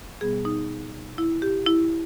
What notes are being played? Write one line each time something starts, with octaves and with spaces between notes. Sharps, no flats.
B2 G3 B3 G#4
D#4
E4
G4
E4